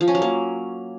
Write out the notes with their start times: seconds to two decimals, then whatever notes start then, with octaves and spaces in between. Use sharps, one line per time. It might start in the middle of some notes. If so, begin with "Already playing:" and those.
0.01 F3
0.08 C#4
0.15 F#3
0.22 A#3